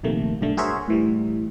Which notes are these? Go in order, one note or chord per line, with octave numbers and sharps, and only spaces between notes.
A#1 C3 D#3 A3 A#3
B1 G2 D3 A3
F#4 G#4 A#4 C5 C#5 E5
A2 E3 G3